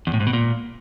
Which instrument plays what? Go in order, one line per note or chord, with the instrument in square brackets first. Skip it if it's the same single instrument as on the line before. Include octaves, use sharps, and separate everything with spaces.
[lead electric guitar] E2
A2
G#2
B2
A#2